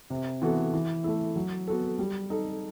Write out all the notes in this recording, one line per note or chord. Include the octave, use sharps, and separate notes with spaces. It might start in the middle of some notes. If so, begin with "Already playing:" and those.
C3
E3 B3 F#4 A4
E3
A3 E4
F#3
B3 F#4 A4
G3
D#4 A4